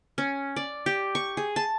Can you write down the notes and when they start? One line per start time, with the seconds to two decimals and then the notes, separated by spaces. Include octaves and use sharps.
0.18 C#4
0.56 D5
0.86 G4
1.15 C#6
1.37 G#4
1.56 A5